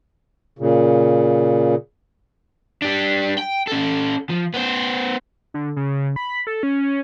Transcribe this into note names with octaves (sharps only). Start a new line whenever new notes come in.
A#2 C#3
G3 D4
G5
C#4 A4
F3
B3 C5
D3
C#3
B5
A4
C#4